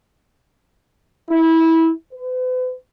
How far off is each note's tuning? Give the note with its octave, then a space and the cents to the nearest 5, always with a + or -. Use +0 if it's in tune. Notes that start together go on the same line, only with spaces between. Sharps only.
E4 -20
B4 +45